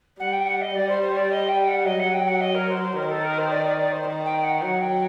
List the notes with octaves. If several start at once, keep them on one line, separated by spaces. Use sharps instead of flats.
G3 F#5
G5
F#5
D#5
G3 D5
C5
C5
D5
D#5
G5
F#5
F#3 D#5
F#5
G5
F#5
D#5
A#4
C5
C5
D#3 A#4
A4
A#4
C5
D5
D5
D5
C5
D#3
G5
F#5
F#3 F#5
G5